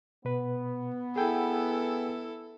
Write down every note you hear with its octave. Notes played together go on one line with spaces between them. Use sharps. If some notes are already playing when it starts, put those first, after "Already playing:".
B2 B3 B4
E4 G#4 A4 G5 G#5